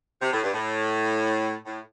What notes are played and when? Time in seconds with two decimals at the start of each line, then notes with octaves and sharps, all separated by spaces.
0.21 C3
0.32 A2
0.43 G2
0.53 A2
1.66 A2